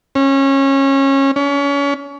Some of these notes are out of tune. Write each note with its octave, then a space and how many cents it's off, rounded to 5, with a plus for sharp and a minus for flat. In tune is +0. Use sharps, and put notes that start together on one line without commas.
C#4 -25
C#4 +30